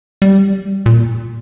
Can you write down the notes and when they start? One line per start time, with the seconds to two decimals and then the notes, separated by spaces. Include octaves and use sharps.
0.22 G3
0.86 A#2